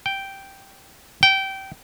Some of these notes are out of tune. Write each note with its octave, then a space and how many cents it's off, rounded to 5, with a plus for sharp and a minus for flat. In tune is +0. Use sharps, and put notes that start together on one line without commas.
G5 -5
G5 -20